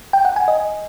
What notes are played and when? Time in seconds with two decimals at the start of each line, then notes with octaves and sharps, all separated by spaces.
0.13 G5
0.25 F#5
0.36 G#5
0.48 D#5